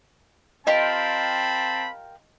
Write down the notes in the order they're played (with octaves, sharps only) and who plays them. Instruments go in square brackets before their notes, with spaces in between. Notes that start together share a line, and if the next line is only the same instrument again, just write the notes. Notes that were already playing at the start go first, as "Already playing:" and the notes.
[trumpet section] C4 A5 B5 [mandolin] F4 G4 A#4 [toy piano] D#5